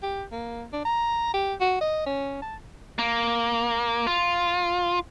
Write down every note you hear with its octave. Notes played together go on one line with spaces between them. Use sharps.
G4
A#3
D4
A#5
G4
F#4
D#5
C#4
A5
A#3
F4